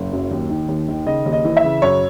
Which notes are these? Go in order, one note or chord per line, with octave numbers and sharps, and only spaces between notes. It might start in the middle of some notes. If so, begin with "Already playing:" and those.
Already playing: F#1
F#2
D#2
D#3
D#2
D#3
C#3 D#5
D#2
D#5
E3
E5
C#3
F#2 C#5